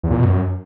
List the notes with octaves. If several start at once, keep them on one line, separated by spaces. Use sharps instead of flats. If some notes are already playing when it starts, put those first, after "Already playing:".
E2
A#2
B2
F#2